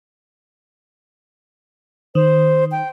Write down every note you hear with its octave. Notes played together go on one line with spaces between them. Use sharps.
D#3 C5
G5